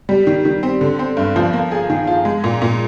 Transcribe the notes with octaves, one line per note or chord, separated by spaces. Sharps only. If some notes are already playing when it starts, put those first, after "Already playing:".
G3
D#3
D#3
C4
D3
C4
G2
F3
A#3
G#4
D#3
F4
G#3
A#2
A#2